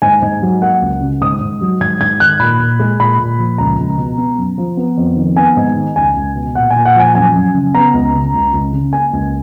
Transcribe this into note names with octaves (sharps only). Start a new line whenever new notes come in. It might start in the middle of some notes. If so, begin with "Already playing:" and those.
G#2 G#5
G#2
F#3
A#3 F#5
C#2
C#3
G#2 D#6
G#2
F#3
G#2 G#6
G#2 G#6
D#3 F#6
A#2 B5
A#2
G#3
A#2 B5
A#2
F3
C#2 A#5
C#2
B2
B3
F#2
F3
B3
F2
D#3
B3 G#5
G#2
D#3
C#2 G#5
C#2
B2
A#2 F#5
G#5
A#2
F#5
F3 G#5
F#2 G#5
F#2
C#3
B3 A#5
C#2
C#3
C#2
C#2
C#3
A#3 G#5
C#2